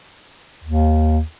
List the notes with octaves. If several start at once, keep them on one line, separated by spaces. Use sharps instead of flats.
D#2